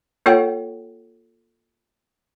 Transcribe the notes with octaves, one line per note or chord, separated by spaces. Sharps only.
A#3 F4 A4 C#5 F#5 G5